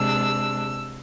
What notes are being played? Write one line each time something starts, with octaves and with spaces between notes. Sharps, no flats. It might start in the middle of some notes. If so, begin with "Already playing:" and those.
Already playing: C3 G#3 D4 E6